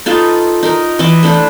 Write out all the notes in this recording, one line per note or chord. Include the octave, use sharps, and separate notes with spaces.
D#4 F4 A4 B4
D#4 A#4
E3 D#5 E5 D6
A3 D4 E4 C5